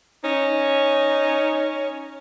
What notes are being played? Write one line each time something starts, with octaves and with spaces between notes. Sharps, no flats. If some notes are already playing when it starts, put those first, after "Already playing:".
C#4 D#4